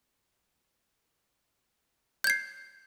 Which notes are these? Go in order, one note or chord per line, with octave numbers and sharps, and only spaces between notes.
G6 G#6 C7